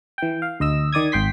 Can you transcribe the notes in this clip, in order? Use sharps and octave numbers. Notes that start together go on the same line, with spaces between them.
E3 G5
F5
D2 D#5 E6
D#3 D5 D#6 G#6
G#1 G5 C6 B6